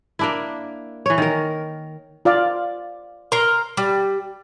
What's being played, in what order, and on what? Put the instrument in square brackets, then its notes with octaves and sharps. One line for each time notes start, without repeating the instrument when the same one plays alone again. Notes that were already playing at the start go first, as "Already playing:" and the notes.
[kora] A#3 D4 E4
E3 C#5
D#3 A#4
[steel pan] F4 D5 F5
[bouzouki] A#4 A#5 [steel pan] C6
[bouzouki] G3